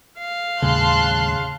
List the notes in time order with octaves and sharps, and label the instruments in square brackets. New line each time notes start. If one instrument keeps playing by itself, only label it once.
[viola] F5
[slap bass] D#2 A2 G3 [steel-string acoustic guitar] C#3 [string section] A5 C6 F#6